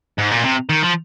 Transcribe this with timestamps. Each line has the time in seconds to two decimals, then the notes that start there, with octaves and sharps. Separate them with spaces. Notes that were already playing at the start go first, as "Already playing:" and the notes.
0.18 G#2
0.31 A#2
0.44 C3
0.69 D#3
0.83 F3